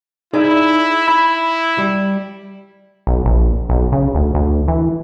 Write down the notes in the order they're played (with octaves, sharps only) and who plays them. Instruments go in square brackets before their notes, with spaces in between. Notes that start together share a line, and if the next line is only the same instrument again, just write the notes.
[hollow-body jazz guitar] D#4 G#4 D5 [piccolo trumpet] E4
[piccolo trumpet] E4 [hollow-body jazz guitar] B5
[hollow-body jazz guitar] G3
[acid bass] B1
A#1
B1
C#3
D2
D2
E3